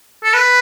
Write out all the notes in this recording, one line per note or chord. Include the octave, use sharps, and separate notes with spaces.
A4
B4